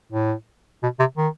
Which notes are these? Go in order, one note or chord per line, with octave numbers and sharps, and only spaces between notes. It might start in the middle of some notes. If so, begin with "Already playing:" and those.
A2
B2
C3
D#3